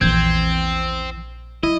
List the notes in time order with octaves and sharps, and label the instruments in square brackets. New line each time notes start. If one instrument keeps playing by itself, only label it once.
[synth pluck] A#1 G6 G#6 [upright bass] E2 E3 [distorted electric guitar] C4
[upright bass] F#3 [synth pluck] E4 [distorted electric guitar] D#5